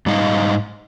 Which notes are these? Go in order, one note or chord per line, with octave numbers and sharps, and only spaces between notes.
G#2 G3 D#4 D#5 F5